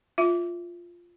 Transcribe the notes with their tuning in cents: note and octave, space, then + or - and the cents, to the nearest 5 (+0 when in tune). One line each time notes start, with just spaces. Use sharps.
F4 -5 E5 +0